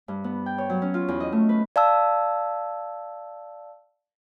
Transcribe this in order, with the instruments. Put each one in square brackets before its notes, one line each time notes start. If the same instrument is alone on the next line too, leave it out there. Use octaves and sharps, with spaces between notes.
[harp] G2
B3
G5
C#5
F#3
C#4
F4
E2
D#5
A3
B4
[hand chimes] D5 F5 A5 E6